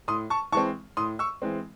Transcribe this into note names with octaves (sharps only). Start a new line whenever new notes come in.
A2 C6 D#6
A5 C#6
E3 G#3 C4 A5 C#6
A2 C6 D#6
C#6 E6
E3 G#3 C4